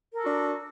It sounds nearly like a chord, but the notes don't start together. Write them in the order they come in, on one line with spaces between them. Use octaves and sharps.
A#4 A4 F#4 D4